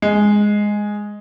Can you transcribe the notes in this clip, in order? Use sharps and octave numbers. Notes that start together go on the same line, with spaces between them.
G#3